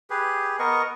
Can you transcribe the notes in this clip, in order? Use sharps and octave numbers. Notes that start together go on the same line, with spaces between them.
G4 G#4 B4
B3 A#4 D#5 C#6